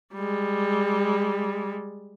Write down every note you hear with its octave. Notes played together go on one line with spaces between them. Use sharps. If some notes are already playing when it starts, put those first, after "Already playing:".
G3 G#3